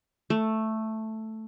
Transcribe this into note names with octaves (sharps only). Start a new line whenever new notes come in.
A3